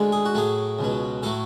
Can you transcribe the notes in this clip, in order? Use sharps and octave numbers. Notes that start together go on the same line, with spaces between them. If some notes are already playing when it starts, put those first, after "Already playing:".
Already playing: D2 D3 G#3
G#4
F#4
A2 F#3 A3 G#4
C#2 B2 F#3
A2 F#3 A3 A4